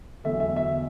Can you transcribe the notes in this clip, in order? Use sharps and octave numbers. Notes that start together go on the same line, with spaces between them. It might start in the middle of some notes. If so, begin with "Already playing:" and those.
E2 D3 F#3 A3 E5
E5
E5